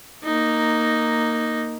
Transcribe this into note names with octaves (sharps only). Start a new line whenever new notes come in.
A#3 D#4